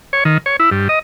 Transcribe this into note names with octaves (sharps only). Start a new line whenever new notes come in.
C#5
D#3
C#5
E4
G2
D#5